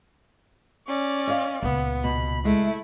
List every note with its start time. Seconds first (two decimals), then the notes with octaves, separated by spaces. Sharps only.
0.87 C#4 D5
1.27 D#5 F5
1.63 C#2 A#2 B3
2.04 B2 B5
2.45 G#3 A3 E4